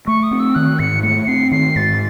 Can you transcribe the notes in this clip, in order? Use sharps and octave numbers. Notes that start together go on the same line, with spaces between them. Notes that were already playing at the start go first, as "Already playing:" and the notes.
A3 C#6
D#6
C4
E6
D#3 F#6
G#2 C#7
A3 C#7
C4 C7
D#3 C7
G#2 A6